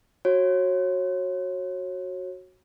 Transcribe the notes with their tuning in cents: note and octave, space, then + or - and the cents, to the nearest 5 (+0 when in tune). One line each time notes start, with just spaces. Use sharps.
F#4 +0 C#5 -30